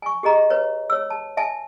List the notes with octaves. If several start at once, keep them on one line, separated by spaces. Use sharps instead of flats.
G#5 C#6
G4 G#4 D#5 A#5
B4 C#5
C#5 E6
A5
E5 G#5 A5